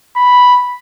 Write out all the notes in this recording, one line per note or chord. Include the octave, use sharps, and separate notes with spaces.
B5